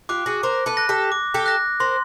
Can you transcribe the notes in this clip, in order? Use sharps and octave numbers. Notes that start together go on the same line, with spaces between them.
F4 G4 D6 F#6
F#4 G#4
A#4 C5 D6
A4 B4
F#6 A#6
G4 A4
D6
G4 A4
F#6 A#6
A#4 C5 C6